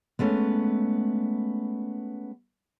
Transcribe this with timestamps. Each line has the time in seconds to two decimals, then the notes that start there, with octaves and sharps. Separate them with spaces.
0.19 G#3 A3 B3 C#4